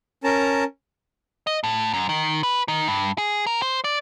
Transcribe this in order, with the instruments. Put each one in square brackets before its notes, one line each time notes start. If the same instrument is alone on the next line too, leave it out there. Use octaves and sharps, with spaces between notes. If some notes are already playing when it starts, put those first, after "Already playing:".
[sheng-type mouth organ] C#4 A#4 A5 A#5
[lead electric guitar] D#5
A2
F#2
D#3
B4
D#3
G2
G#4
A#4
C5
D5